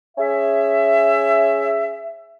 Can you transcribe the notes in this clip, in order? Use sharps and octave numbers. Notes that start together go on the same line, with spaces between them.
C#4 G#4 E5